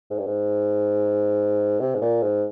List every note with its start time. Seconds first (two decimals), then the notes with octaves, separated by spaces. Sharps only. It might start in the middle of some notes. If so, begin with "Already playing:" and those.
0.10 G#2
0.19 G2
0.27 G#2
1.80 C3
1.95 G#2
2.01 A#2
2.22 G#2